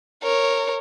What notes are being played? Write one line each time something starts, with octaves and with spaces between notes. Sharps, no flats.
A#4 C#5